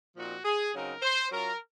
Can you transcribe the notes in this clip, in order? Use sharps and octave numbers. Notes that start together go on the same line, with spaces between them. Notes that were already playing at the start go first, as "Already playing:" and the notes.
A#2 F3 C4 D#4 F#4
G#4
C#3 F#3 C4 D#4 A#4
C5
F#3 C#4 F4 A#4